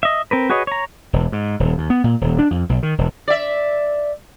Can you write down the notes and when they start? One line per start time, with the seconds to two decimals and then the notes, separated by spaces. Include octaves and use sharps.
0.03 D#5 E5
0.31 C4 A#4 B4
0.50 F#4 G#4 B4 C#5 D#5
0.67 C#5 A#5
1.13 E1
1.32 G#2
1.60 D#1
1.78 D#2
1.90 B3
2.04 A#2
2.21 D#1
2.39 D4
2.51 F2
2.69 B1
2.83 D#3
2.98 E1
3.28 D5 E5